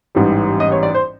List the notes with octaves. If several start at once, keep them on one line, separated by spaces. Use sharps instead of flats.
A1 G#2 E3 G3
D#5
C#5
D5
C5